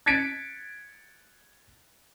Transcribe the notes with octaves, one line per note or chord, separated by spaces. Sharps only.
G#6 A6 B6 C#7 D7